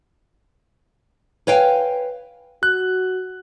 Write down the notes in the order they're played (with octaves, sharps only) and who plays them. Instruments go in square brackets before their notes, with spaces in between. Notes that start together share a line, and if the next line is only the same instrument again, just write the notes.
[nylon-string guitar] B4 C#5 F5 G5 G#5
[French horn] F#4 [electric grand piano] F#6